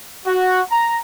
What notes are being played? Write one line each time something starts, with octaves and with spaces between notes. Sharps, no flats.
F#4
A#5